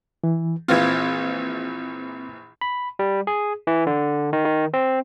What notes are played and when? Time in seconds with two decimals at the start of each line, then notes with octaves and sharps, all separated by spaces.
0.24 E3
0.68 A#1 E3 C4 F4 G#6
2.61 B5
2.99 G3
3.27 G#4
3.67 E3
3.87 D3
4.33 D#3
4.45 D#3
4.74 C4